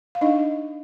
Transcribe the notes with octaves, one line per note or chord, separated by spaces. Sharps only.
F5
D4 D#4 D#5